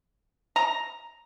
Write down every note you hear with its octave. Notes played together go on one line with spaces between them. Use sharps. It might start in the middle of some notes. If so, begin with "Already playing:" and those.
A#5